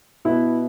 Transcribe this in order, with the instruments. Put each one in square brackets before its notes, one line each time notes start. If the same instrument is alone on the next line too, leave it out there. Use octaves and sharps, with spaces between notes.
[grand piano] B2 B3 E4